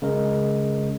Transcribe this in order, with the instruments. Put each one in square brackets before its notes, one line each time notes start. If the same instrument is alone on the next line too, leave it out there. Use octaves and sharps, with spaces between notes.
[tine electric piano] C#3 G#3 A#4